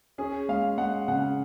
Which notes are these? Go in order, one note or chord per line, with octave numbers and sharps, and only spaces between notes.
C#4 G#4
G#3 F5
G#3 F#5
C#3 F#5